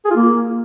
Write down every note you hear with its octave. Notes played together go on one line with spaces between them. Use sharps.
G#4
F4
A#3